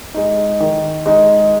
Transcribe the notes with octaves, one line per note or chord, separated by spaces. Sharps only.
G#3 D#4
D#3
G#3 D#4